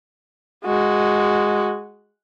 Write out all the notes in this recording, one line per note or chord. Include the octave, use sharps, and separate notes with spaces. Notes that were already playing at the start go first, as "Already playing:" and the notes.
G#3 F#4